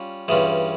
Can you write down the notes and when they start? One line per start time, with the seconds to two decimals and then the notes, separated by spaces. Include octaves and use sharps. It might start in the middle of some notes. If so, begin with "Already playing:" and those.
Already playing: G3 C#4 F4
0.28 G2 E3 G3 C#4 F4 G#4